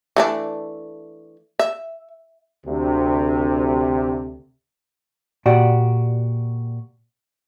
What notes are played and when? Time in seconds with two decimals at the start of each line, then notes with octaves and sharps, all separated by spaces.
0.16 E3 A3 D4
1.59 E5
2.67 D2 C3
5.46 A#2 F#4 G4 D5